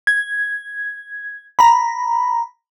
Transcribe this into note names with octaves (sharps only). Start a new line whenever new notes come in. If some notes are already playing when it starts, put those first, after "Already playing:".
G#6
A#5 B5